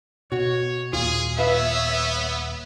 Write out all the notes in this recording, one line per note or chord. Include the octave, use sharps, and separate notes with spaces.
B2 F#4 C#5
D#1 A#2 F4 G#4
B3 B4 C#5 E5 F5